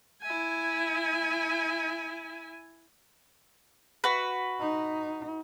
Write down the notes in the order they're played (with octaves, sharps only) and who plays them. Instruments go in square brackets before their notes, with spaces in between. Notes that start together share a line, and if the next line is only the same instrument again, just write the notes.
[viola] E4 G#5
[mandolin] F#4 B4
[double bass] D#4